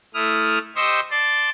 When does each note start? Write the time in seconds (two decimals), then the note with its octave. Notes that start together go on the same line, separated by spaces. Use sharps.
0.14 A3 E4 D#6 F6
0.76 G4 C5 D#5 C#6 D#6 E6
1.11 D5 A5 C6